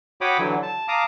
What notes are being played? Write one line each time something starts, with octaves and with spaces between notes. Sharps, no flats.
F#4 C#5 G5 B5 D6 D#6
D3 E3 F#3
A5
F5 A5 A#5 D6 D#6